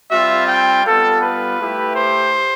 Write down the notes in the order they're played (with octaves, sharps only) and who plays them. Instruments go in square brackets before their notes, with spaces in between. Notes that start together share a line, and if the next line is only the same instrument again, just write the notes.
[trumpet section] G3 C4 F4 E5
G5
G3 B3 F4 A4
B4
A3 E4 G4
C5